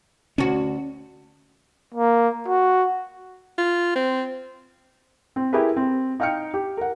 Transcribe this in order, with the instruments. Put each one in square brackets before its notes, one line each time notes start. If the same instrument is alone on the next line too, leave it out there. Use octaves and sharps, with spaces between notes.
[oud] D2 F#4 [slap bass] C#4
[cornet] A#3
F#4
[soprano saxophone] F4
C4
[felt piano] C4
E4 G4 G#4 A#4 B4
C4
D#4 F5 G5 F6 C#7
G4
A#4 F#5